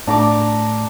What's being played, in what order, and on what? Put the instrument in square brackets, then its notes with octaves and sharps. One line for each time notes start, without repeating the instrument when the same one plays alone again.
[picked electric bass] A2 [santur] D4 A#5 D6